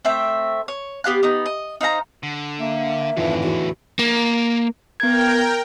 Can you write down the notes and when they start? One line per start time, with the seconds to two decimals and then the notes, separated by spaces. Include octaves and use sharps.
0.05 A3 C4 E5 G5
0.68 C#5
1.04 B3 G4 F5 F#6
1.23 B3 D#4
1.46 D#5
1.81 D#4 C5 F5 A#5
2.23 D3
2.60 A#3 E5
3.17 G#1 F2 A2 D3 E3 F3
3.43 E2 F#4
3.99 A#3
5.00 B3 A#4 G5 G#6